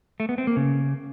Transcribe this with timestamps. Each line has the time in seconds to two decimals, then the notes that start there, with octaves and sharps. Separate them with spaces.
0.20 A3
0.29 B3
0.38 C4
0.47 A#3
0.56 C#3